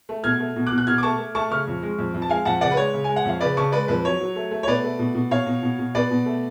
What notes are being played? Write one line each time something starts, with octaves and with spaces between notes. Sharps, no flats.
A3
B2 F6 G#6
A3
B2
D6 F#6
B2
F#6
B2 F6 G#6
D6
A3 A5 C#6
A3
A3 A5 C#6
C#3 C#6 F6
F2
G#3
F2
F2
A5
G#3 F5 G#5
F2 F#5 A5
C#3 D5 F#5
B4
G#3 C#5
C#3
G#3 G#5
F#5
F2 F5
C#3 B4 D5
C#3 A5 C#6
G#3 B4 D5
F2 B4
F#3 C#5
F#3
A3
A3
C#5
B2 B4 D5
A3
B2
B2
B2 C#5 F5
B2
B2
B2
B2 B4 D5
B2
A3